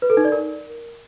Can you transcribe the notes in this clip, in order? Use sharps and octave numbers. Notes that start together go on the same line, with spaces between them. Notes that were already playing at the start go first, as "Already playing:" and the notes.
B4
A4
D#4
D5
A#4